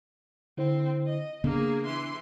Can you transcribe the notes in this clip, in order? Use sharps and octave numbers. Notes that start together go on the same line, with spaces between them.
D3 C4 E4 C5
D#5
C#3 A#3 B3 D4 G#4
E3 C6